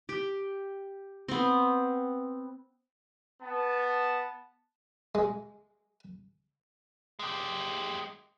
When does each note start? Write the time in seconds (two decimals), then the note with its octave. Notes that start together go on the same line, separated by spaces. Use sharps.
0.09 G4
1.28 B3 C4
3.42 B3 A5
5.15 G#3
7.19 G#3 G4